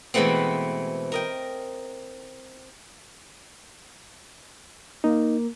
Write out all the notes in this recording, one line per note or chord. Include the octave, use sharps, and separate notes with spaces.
B2 E3 G#3 A3 B3 C4
A#4 D#5 G5
A#3 D#4